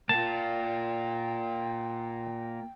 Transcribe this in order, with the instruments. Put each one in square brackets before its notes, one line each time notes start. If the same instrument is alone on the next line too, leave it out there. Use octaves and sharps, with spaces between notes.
[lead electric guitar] A#3 F4 [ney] G5 [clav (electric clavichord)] A5